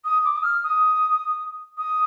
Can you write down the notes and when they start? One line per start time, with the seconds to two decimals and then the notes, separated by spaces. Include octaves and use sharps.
0.04 D#6
0.24 D6
0.35 D#6
0.43 F6
0.63 D#6
1.77 D#6